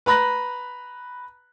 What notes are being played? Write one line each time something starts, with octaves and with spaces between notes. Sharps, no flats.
B4 A#5 B5 F#6 A#6